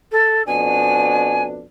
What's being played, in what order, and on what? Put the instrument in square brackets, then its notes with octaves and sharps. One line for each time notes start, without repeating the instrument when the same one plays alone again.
[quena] A4
[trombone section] F2 B2 D4 [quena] G#5